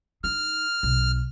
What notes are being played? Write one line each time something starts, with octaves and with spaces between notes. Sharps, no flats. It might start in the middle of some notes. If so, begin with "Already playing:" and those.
D#4 F6
B1